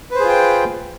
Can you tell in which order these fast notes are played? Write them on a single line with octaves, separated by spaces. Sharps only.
B4 C5 G#4 F4 G5